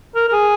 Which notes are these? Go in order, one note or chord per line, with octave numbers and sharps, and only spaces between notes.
A#4
A#4
G#4